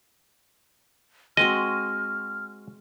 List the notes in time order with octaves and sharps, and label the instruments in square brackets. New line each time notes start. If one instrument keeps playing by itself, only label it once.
[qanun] G#3 C4 F#4 [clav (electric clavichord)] D#5 [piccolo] F6